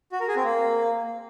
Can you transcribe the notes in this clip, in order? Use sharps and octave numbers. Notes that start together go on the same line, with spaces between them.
F#4
A#4
G#4
C4
A#3